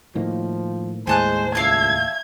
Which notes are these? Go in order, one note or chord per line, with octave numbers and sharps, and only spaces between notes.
A2 D#3 F3 A#3
D#2 A2 G#3 C5 G#5 A5 F#6
C#2 E5 F5 A5 G#6